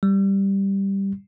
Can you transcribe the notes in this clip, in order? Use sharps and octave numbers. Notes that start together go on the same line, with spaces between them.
G3